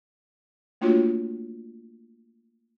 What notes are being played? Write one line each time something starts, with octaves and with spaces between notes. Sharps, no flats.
A3 A#3 D4 F4 F#4 C#5